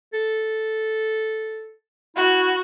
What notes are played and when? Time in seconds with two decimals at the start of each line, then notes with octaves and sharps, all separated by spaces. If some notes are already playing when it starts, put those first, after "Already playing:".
0.13 A4
2.16 E4 F#4